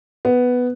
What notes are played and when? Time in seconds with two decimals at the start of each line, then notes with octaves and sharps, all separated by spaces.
0.25 B3